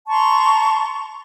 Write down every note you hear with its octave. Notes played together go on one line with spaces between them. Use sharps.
A5 A#5 C6 C#6